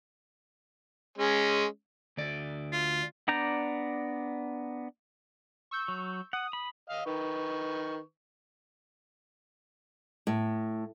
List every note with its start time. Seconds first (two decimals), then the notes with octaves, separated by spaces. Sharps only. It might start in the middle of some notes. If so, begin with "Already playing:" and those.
1.18 G#3 C#4
2.17 D2 D5
2.72 F4
3.28 B3 D4 D5 A#5 G6
5.71 C#6 E6 G6
5.88 F#3
6.33 F#5 D#6
6.53 B5
6.89 D#5 F5 F6
7.06 D#3 B4 C#6
10.27 A2